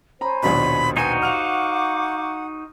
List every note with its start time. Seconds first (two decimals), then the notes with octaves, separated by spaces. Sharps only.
0.21 C5 C#5 G#5 A#5 B5
0.43 A#1 D#2 B2 B5
0.97 D#4 F#4 B4 C5 G5 G#5
1.22 F5 F#5 C#6 D6 F6 C#7 F7